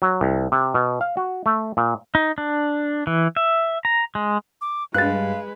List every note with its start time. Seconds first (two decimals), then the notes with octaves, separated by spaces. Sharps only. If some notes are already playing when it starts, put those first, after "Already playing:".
0.02 F#3
0.21 C2
0.52 C3
0.74 B2
1.01 F5
1.17 F#4
1.46 A3
1.77 A#2
2.15 D#4
2.38 D4
3.07 E3
3.36 E5
3.85 A#5
4.15 G#3
4.61 D6
4.94 G2 G#3 B4 F5 F#6 A6